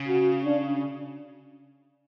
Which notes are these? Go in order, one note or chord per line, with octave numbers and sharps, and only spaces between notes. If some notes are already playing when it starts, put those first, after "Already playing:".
Already playing: C#3
F#4
D4